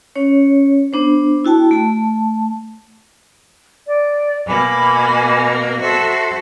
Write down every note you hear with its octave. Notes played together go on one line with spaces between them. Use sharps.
C#4 C#5
B3 D4 C5
E4 F#4 G5 A5
A3 A5
D5
B2 A#3 G#5 B5 D6
F#4 A4 C5 E5 C6